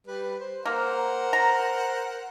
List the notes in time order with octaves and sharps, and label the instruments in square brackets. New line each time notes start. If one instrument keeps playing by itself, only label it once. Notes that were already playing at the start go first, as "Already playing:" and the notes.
[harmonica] G3 B4
C5
[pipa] A#3 [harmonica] A#4 C5 F#5
[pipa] A#5